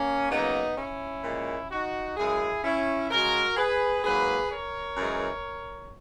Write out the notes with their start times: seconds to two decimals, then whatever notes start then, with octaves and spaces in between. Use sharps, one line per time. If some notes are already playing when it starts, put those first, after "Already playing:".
Already playing: A#3 C#4
0.30 C#3 F#3 A#3 B3 D#4
0.77 C#4 E4
1.24 A#2 G#3
1.70 D#4 F#4
2.17 F#2 C#3 G#3 E4 G#4
2.63 C#4 E4
3.10 C#3 G#3 F#4 A#4
3.57 G#4 B4
4.03 G#2 F#3 A#3 G#4 B4
4.51 A#4 C#5
4.96 F#2 E3 G#3